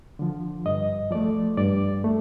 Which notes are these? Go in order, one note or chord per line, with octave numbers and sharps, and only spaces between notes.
D3 F3
G2 D#5
F3 A3 D5
G2 D5
A3